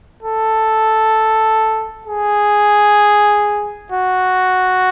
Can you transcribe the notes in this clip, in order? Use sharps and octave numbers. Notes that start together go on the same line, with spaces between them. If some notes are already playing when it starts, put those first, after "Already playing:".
A4
G#4
F#4